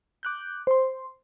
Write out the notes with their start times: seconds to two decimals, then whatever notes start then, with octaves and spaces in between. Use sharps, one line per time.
0.23 D6 F#6 G6
0.67 C5 C6